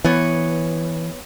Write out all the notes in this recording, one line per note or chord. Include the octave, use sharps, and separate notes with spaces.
E3 B3 C#5